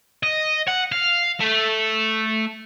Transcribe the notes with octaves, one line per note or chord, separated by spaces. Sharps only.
D#5
F#5
F5
A3